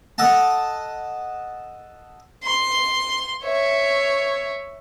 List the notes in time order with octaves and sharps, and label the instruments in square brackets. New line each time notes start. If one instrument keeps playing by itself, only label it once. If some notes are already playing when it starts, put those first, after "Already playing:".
[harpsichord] A4 D#5 F#5 A5
[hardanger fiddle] C6
C#5 E5